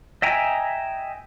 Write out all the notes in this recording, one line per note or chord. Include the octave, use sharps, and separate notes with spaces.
D#5 E5 G5 G#5 A#5